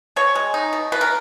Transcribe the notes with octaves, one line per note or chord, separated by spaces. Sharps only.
B2 C#5
G#3
D#4
B2
B2 B4
A#4